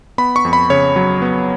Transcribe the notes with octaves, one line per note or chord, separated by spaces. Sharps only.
B3 B5
C#6
F2
B5
C#3 C#5
F#3
B3